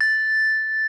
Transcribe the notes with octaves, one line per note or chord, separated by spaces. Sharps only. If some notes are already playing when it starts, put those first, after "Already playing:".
A6